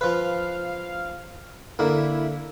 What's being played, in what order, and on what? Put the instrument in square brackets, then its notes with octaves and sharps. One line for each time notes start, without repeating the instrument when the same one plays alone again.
[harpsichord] F3 B4 [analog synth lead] F5
[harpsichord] D3 A#3 [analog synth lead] E4